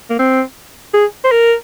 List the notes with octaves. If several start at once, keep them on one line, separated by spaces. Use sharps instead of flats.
A#3
C4
G#4
C5
A#4